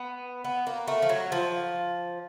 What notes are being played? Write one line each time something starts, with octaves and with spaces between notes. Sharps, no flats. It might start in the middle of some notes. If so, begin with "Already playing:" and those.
Already playing: B3
B3
A#3
A3
F3
F#3
F3